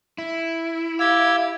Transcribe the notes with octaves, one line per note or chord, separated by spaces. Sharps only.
E4
G4 F5 E6 G#6